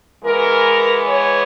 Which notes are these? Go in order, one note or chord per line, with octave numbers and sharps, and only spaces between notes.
E3 G#3 B3 A#4
C#5